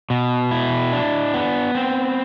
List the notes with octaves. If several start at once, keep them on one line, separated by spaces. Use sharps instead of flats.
B2
E4
D4
B3
C4